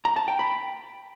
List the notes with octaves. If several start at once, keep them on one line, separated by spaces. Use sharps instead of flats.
A#5
A5
G5
B5